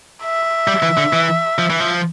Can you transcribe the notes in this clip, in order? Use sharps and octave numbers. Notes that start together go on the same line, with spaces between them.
E5
G3
E3
D3
E3
F3
E3
F3